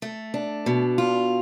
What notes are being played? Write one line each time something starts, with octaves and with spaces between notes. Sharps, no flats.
A3
D4
B2
F4